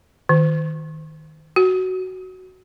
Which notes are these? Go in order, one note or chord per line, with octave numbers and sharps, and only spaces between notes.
D#3
F#4